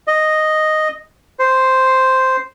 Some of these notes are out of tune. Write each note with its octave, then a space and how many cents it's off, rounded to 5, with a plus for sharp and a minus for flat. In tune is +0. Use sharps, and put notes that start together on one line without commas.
D#5 -5
C5 -5